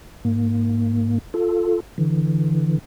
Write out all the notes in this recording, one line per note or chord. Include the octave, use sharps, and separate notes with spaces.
G#2 A#3
F4 A4
D3 E3